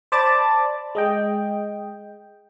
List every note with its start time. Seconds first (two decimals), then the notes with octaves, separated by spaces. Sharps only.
0.12 C5 D5 A5 B5 D6 A6
0.95 G#3 D#5 G5